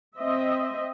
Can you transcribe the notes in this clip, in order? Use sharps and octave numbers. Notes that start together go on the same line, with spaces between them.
C4 D#5 E5